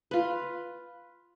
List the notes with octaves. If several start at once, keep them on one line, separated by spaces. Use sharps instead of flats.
F4 B4